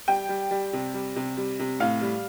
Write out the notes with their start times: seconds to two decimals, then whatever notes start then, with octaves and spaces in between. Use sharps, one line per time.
0.08 G3 G5
0.29 G3
0.51 G3
0.73 C3
0.94 G3
1.16 C3
1.37 G3
1.59 C3
1.80 A2 F5
2.01 G3